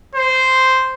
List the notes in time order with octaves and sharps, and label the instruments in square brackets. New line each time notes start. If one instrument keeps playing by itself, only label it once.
[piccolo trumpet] C5